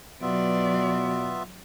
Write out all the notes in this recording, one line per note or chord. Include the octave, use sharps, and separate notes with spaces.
B2 F#3 B3 F4 D5 E5